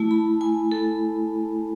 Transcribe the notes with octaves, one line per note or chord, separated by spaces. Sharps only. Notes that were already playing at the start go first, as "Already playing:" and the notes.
Already playing: A3 E4 A5
B5
G#5
A4